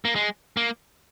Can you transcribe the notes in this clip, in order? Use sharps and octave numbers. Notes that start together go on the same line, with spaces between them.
A#3
G#3
A#3